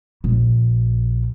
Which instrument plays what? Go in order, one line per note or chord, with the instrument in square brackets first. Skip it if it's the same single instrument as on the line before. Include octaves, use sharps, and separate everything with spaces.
[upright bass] A#1